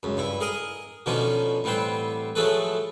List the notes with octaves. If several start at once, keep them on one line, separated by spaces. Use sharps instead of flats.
C#2 F#2
G2 E4
G#4 A#4 D#5
B2 D3 F3 A#3 C#4 D#4
A1 G3 B3 C4 C5 G5
F3 F#3 G#3 A3 A4 B4